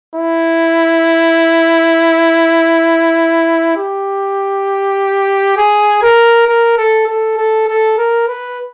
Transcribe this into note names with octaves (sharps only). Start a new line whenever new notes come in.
E4
G4
G#4
A#4
A#4
A4
A4
A4
A4
A#4
B4